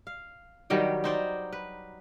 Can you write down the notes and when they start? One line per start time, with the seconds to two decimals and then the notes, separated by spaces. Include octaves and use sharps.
0.07 F5
0.70 D#3 F#3 G3 G4
1.04 D#4 C5 D5
1.53 B4